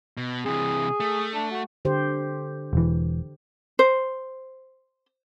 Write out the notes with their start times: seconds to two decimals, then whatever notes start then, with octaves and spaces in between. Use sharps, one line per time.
0.17 B2
0.46 C3 E3 G#4
1.00 A3
1.34 D4
1.51 F#4
1.85 D3 G4 C5
2.73 E1 E3
3.79 C5